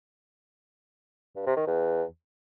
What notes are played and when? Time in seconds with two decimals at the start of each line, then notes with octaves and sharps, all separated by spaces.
1.36 G2
1.46 C3
1.57 D#3
1.67 E2